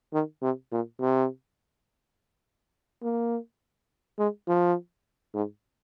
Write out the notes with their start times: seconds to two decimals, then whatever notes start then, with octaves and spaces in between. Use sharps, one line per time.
0.13 D#3
0.42 C3
0.72 A#2
1.00 C3
3.03 A#3
4.19 G#3
4.48 F3
5.34 G#2